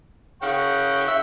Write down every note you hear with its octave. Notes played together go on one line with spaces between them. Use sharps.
C#3 F#5 G5 C#6
E5